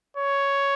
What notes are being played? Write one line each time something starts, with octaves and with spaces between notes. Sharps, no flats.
C#5